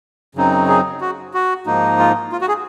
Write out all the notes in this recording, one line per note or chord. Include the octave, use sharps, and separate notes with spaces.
F#2 C#3 F#3 C4 D#4
G#4
F#4
F#4
G#2 F3 A#3 D#4
F4
F4
F#4
G#4